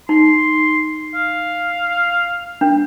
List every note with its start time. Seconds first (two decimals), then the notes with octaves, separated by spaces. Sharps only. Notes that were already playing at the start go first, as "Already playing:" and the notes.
0.09 D#4 C6
1.15 F5
2.61 D4